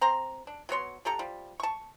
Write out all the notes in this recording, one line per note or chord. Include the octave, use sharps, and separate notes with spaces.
C4 A#5 C6
D4
F#3 B3 C#5 C6
D4 G4 A4 A#5
F3 G3
A5 C#6